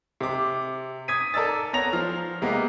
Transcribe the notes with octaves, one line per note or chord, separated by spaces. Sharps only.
C3 D6
D#6 G#6 B6 D#7
A4 A#4 D5 E6 A6
B3 C#5 A#5 A#6 F7
F3 F6
C3 G#3 A#3 B3